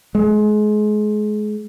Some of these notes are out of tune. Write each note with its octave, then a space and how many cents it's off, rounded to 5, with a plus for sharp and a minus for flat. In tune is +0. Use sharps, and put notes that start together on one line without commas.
G#3 +30